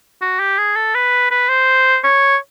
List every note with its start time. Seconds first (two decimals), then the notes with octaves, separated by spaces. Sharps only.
0.22 F#4
0.40 G4
0.58 G#4
0.76 A4
0.95 B4
1.31 B4
1.49 C5
2.04 C#5